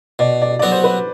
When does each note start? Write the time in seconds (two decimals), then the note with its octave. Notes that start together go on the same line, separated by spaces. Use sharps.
0.19 B2 D5
0.42 D5
0.59 F#3 B3 F#4 D5
0.72 C5
0.84 B4